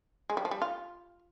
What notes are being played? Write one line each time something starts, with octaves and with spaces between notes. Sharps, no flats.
G#3
G3
F3
G3
F4